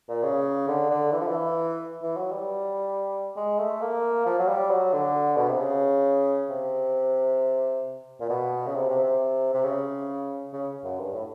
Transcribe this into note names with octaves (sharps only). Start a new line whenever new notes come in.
A#2
C#3
D3
D3
E3
F3
E3
E3
F#3
G3
G#3
A3
A#3
F3
F#3
G3
F#3
D3
B2
C3
C#3
C3
A#2
B2
C#3
C3
C3
C3
C3
C#3
C#3
F#2
G2
A2